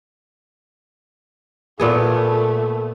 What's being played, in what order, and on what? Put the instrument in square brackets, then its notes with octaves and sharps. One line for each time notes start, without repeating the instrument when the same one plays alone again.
[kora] A#2 B3 G#4 [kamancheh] A3